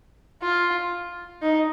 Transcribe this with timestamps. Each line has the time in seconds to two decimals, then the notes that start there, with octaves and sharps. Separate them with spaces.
0.42 F4
1.42 D#4